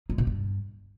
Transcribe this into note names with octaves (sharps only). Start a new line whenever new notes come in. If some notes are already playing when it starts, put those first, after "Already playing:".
G#3
B2
G2